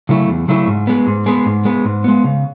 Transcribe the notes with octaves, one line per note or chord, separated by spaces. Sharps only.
C#3 F#3 A3 E4
E2
C#3 F#3 A3 E4
G#2
G#3 B3
G#2
G#3 B3
G#2
G#3 B3
G#2
G#3 B3
C#3